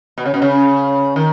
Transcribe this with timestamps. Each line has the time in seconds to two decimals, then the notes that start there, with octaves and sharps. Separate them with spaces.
0.18 B2
0.25 C#3
0.34 B2
0.42 C#3
1.16 D#3